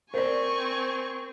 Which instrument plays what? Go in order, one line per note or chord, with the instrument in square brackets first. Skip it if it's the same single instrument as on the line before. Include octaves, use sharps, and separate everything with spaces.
[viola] C4 [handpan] A#4 [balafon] C5 D5 [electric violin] G#5 C#6